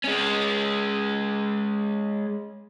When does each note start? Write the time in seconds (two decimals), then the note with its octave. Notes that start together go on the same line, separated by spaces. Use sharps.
0.04 G#3 C#4